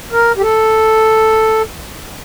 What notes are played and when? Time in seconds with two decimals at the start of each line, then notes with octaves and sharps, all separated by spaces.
0.12 A#4
0.37 G4
0.41 A4